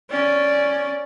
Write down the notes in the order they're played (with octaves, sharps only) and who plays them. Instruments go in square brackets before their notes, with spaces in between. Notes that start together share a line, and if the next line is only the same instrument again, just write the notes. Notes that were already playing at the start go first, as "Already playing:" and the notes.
[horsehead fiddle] C#4 D5